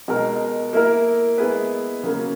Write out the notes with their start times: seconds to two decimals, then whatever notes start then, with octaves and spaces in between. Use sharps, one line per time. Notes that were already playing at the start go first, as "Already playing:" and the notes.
0.08 B2 G#3 D#4 A#4
0.73 A#3 E4 A#4
1.38 G#3 B3 E4 G#4 B4
2.03 C#3 F#3 A#3 C#4